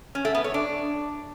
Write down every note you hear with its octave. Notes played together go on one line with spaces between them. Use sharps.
C#4
A3
B3
C#5
D4